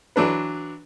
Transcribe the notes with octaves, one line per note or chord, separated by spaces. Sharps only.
E3 F#3 D4 B4